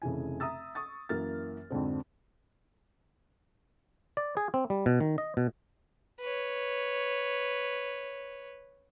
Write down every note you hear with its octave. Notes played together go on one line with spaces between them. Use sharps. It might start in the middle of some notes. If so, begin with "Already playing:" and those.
F1 C#3 E3 G#5
E5 A#5 D#6 E6 A6
C#6 D#6 A6
F#2 E3 A#3 F6 A6
F2 G#2 D3 C4
D5
G#4
C4
G3
B2
D#3
D#5
B2
B4 C#5